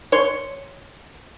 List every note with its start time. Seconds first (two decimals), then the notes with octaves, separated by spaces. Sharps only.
0.12 C#5 C6